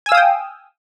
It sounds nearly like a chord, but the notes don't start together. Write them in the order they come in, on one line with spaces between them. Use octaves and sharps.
G#5 E6 F5 D#6 G5